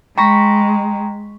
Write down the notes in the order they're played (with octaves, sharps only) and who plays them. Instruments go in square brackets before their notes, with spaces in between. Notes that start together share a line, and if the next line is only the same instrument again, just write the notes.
[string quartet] G#3 [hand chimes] G5 A#5 [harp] B5 C#6 A#6